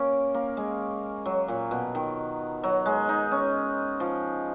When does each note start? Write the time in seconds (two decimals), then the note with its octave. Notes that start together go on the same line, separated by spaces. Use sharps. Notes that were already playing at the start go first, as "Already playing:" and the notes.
Already playing: A#3 C#4
0.34 A#3
0.57 G#3
1.26 F#3
1.48 A#2
1.71 B2
1.95 D#3
2.63 F#3
2.86 G#3
3.09 D#4
3.32 C#4
4.00 F3